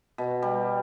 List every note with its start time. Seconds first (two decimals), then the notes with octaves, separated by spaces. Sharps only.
0.18 B2
0.42 G3